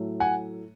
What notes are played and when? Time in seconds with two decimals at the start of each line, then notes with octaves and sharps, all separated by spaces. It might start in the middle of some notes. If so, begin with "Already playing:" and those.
Already playing: A2 F#3 A3
0.20 F#5 G#5